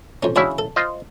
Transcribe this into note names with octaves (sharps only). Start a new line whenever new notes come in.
F2 C#4
C#3 D4 E4 F#4 C#5
A4
F4 C5 D#5